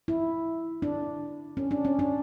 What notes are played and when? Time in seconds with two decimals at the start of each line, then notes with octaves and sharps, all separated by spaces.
0.08 E4
0.82 D4
1.57 C#4
1.71 D4
1.85 C#4
1.99 D4